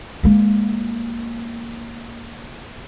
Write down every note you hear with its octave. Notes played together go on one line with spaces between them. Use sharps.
G#3 A#3